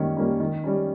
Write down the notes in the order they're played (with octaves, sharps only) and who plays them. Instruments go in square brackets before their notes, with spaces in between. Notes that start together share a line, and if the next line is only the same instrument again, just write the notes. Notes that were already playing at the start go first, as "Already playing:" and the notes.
Already playing: [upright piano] D#3 G3 A#3 C#4
G3 A#3 C#4
D#3
G3 C#4